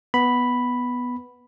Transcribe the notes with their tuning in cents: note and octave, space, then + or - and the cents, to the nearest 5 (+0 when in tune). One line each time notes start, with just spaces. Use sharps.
B3 +0 B5 +0